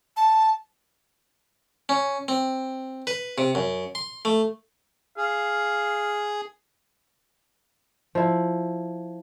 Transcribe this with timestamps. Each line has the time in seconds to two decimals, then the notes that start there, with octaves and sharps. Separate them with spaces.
0.17 A5
1.89 C#4
2.28 C4
3.07 B4
3.38 C3
3.55 F#2
3.95 C6
4.25 A3
5.17 G#4 F5
8.15 F3 E4